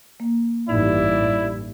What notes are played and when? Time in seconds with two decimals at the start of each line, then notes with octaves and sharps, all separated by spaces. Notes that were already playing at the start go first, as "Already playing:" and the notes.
0.20 A#3
0.69 A1 G2 D#4 E4 D5